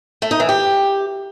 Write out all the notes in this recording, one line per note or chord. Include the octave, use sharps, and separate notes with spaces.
A3
D#4
E3
G4